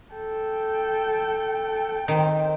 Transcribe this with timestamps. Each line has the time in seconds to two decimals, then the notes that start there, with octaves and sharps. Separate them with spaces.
0.15 A4 G5
2.08 D#3 C4